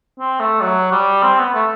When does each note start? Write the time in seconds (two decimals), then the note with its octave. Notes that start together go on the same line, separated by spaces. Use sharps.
0.19 C4
0.40 A3
0.61 F#3
0.92 G3
1.23 C4
1.39 B3
1.54 A3